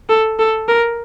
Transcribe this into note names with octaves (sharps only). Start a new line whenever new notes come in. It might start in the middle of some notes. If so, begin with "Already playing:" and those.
A4
A4
A#4